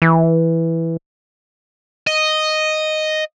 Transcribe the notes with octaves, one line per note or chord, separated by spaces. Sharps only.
E3
D#5